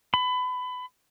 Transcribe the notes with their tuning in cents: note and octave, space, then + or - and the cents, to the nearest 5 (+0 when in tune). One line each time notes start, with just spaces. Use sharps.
B5 +25